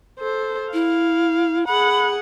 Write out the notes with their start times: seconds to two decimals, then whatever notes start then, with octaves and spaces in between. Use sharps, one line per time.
0.19 A4 C5
0.73 E4 F5
1.67 G#4 F#5 B5